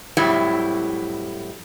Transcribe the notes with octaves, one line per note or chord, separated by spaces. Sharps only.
F2 A2 F#3 G3 E4